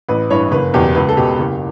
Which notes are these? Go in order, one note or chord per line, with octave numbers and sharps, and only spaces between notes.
A1 B4
G2 E3 C#5
F#1 B4
E2 B2 G4
C#2 B4
A4
B2 G4
F#1 G4